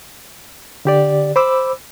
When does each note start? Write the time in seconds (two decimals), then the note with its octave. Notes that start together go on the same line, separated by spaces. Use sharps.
0.85 D3 G4 D5
1.36 C5 B5 D6 E6